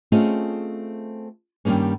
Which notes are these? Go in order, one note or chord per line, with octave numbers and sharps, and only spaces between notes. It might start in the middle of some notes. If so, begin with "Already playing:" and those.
A3 C4 C#4 F4 G#4 D#5
G2 D#3 G3 A#3 C#4